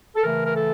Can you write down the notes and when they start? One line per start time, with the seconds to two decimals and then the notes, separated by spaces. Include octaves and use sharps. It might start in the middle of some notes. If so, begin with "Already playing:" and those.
0.16 A4
0.23 C#3 E3 A3 A#4
0.44 A#4
0.56 A4